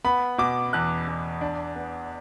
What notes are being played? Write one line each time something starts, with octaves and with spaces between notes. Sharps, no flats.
B3 B5
B2 D6
E2 F#6
E2
D4
B3